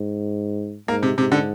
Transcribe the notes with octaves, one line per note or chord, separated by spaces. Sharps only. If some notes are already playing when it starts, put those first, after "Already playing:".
Already playing: G#2
G#2 A#3
C3
G#2 C3
D3